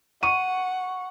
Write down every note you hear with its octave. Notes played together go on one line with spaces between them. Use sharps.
F#5 C#6 D#7